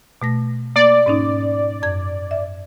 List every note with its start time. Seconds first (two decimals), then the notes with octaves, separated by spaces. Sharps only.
0.22 B2 A3 A#6
0.76 A#3 D5
1.06 G#2 C#4 D#4
1.83 F#2 G#6
2.31 E5